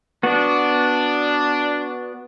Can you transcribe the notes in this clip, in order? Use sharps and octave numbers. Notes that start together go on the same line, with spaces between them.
B3 D4 F#4